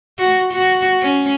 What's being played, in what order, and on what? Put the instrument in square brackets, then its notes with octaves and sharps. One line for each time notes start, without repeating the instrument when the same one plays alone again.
[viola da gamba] F#4
F#4
C#4